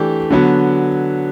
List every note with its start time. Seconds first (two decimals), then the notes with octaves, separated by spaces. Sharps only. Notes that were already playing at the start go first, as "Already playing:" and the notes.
Already playing: E3 A3 D4 G4
0.30 D3 F#3 B3